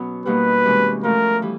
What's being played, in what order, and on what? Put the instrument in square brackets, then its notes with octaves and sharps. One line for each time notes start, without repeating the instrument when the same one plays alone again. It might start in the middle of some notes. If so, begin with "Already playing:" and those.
Already playing: [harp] B2 F#3 B3 C#4
[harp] B2 G3 A#3 D#4 F#4 [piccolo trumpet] B4
[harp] C3 E3 G#3 C#4
[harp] F3 A3 C#4 F4 [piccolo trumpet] A#4
[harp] E3 G3